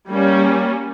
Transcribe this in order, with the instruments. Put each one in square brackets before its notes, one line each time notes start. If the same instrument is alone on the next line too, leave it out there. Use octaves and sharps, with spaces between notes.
[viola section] G3 A#3 C#4